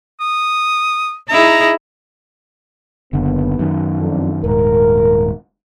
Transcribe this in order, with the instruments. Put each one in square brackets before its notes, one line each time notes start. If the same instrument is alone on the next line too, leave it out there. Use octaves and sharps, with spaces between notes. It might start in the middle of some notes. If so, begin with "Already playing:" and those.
[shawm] D#6
[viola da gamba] D#4 E4 G#4 [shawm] A#5
[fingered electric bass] F#1 D3 [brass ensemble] D#2 B3
[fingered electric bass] F#2 D#3
[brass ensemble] F2 D4
[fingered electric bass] D#1 G#2 [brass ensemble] A#4